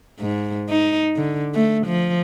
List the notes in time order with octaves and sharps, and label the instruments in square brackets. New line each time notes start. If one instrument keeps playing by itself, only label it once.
[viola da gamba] G#2
D#4
D3
A3
F3